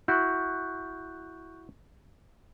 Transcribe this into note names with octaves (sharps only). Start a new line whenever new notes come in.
E4 F#4 C#6 F#6 G6